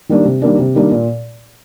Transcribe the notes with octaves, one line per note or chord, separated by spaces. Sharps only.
D#3 G3 A#3 D4
C3
D#3 G3 A#3 D4
C3
D#3 G3 A#3 D4
A#2